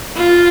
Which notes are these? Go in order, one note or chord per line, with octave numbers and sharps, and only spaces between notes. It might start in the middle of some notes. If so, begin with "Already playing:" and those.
F4